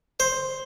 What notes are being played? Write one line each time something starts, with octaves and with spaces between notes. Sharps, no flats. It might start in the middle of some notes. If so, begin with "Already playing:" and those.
C5